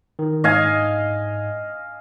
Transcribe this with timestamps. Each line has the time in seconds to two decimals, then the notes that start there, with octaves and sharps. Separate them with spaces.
0.19 D#3
0.44 G#2 D#5 F5 G#5